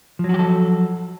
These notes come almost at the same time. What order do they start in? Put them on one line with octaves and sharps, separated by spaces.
F3 F#3 F#4 G4 A4